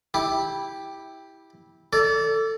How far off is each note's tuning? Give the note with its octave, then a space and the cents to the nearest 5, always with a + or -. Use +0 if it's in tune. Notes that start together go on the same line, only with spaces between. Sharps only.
E4 -15 G4 +5
A4 +20 D5 -25